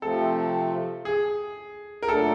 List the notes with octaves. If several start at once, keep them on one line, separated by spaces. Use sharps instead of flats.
C3 F3 A3 C4 A4
G#4
A#4
A#2 F#3 A3 D4 A4